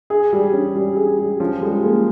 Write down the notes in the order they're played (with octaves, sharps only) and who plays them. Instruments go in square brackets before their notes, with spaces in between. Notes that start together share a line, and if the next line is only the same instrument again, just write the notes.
[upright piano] G#4
G3
C#4
G3
G#4
G3
[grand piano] F3 [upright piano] C#4
[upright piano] G3 [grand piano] G#3
[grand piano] A#3 [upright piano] G#4